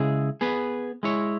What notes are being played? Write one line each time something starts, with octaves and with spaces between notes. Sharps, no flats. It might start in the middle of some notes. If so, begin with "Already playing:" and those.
Already playing: C#3 G#3 E4 G#4
B3 G#4 B4
G#3 E4 C#5